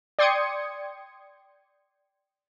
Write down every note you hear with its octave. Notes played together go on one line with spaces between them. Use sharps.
D5 G5 C6 D#6 G#6 C#7